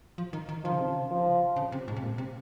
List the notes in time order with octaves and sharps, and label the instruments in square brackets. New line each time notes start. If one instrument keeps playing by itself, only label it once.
[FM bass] F3
D#3
D#3
[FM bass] D#3 [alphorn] F3
[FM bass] C#3
C3
C#3
[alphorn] F3
[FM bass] C#3
C3
G#2
C3
A#2
C3